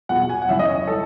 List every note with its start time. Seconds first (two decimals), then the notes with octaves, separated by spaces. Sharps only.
0.09 E2 B2 F#3 F#5
0.29 G#5
0.42 F#5
0.48 F#2 C#3 E3 E5
0.59 D#5
0.68 C#5
0.87 E3 A4